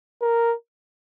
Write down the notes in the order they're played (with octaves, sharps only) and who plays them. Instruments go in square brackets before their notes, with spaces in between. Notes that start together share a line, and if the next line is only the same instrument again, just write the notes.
[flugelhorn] A#4